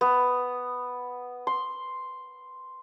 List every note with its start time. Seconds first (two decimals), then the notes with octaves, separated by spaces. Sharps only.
0.01 B3
1.47 C6